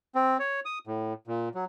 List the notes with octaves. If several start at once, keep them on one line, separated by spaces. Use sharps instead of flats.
C4
C#5
D#6
A2
A#2
F#3